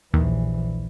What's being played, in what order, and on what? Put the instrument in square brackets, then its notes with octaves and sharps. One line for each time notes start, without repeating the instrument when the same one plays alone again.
[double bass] A#1 E3 [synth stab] D#2